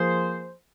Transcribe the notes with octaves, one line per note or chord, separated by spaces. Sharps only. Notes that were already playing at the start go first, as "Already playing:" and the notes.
Already playing: F3 A#3 G#4 C5